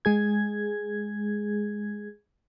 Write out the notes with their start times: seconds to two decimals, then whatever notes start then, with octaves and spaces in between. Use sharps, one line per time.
0.05 G#3 G#4 G#6